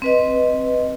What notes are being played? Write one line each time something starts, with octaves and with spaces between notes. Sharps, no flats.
C4 B4 D#5